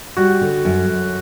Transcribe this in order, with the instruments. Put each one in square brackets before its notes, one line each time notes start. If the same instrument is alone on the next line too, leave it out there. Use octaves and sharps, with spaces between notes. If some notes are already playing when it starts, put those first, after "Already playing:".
[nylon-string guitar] G3 [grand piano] F#4
[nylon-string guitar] D3
F#2
F#2